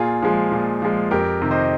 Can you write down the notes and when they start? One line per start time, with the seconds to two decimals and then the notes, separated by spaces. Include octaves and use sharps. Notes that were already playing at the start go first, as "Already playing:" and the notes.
Already playing: A#2 F4 G#4
0.22 F3 G#3
0.52 A#2
0.82 F3 G#3
1.11 F2 G4 A#4
1.42 C3 D#3
1.51 C5 D#5